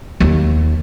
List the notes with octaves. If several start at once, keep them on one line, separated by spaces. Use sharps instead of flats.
D#2